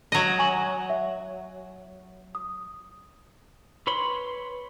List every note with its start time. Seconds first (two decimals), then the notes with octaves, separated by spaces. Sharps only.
0.12 F#3 D#5
0.39 G#5 C#6 F#7
0.90 E5
2.35 D#6
3.87 B4 C#5 B5 C6